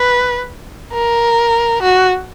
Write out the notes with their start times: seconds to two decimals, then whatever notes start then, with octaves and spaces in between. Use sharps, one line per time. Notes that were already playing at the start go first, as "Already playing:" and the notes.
Already playing: B4
0.94 A#4
1.83 F#4